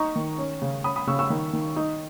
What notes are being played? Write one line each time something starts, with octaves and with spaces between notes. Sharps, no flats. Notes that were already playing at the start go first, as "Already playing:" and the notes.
Already playing: D#4 A#5 C#6
D#3
C#4
C#3
C#4 B5 D#6
B5 D#6
C#3 C#6 E6
C#6 E6
D#3
D#3
D#4